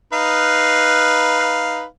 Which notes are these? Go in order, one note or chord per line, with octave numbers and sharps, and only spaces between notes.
D#4 B4 F5